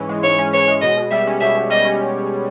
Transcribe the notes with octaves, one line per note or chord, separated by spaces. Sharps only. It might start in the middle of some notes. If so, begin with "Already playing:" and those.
Already playing: G#2 E3 C#4
G#3
G#2 C#5
C#4
E3 C#5
G#3
B2 D#5
B2
G3 E5
C#4
B2 E5
B2
G3 D#5
C#4